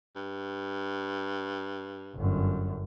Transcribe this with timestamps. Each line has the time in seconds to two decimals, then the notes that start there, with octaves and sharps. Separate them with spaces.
0.16 G2
2.15 G1 F#2